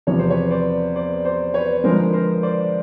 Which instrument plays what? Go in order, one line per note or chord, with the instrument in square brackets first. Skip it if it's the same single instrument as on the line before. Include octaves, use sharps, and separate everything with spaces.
[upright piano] E2 C3 F3 [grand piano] C#5
[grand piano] C5
B4 C#5
C5 D5
C5 D5
C5 D5
B4 C#5
[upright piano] D3 F3 G#3 [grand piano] A#4 C5
[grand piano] B4
A#4 C5
C5 D5